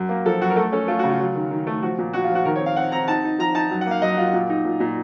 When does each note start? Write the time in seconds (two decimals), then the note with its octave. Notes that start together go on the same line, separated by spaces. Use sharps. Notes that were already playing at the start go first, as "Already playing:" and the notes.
Already playing: F#2
0.09 A#3
0.26 F3 A4
0.41 F#2 F#4
0.50 A#4
0.56 A3 A4
0.72 C#4 A4
0.88 A3 F4
0.99 F#4
1.04 C#3
1.10 F4
1.20 F#3
1.35 D#3
1.51 D#3
1.67 A3
1.83 F3 F#4
1.98 A#2
2.13 A#2 F#4
2.24 F4
2.30 F3
2.35 F#4
2.45 D#3 A#4
2.56 C#5
2.61 C4
2.66 F5
2.76 C4 F#5
2.92 C4 A#5
3.08 D#4 A5
3.24 D#4
3.39 F3 A#5
3.54 D#4 A5
3.70 F#2
3.81 F#5
3.86 A#3 F5
4.02 F#2 D#5
4.17 F#2 F4
4.33 A#2
4.50 D#4
4.65 A#2
4.80 A#2